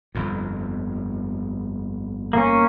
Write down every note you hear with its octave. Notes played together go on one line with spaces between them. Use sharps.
G1 F2
A#3 C#4